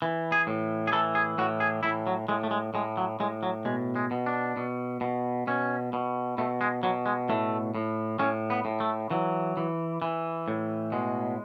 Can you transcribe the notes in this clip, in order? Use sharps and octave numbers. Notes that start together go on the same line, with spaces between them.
E3
G#4
A2
G#4
E3 A4
G#4
A2 F#4
G#4
A2 E4
F#3
A2 G#3
A3
G#3
A2 G#3
F#3
A2 G#3
F#3
B2 G#3
G#3
B2
D4
B2
B2
B2 C#4
B2
B2 A3
G#3
B2 F#3
G#3
A2 A3
A2
A2 C#4
B3
A2
A3
E3 F#3
E3
E3
A2
B2 G#3